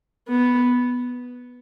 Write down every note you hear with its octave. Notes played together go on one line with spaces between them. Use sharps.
B3